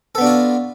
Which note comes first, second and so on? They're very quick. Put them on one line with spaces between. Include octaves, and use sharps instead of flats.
A4 B3 D4 F#4 F4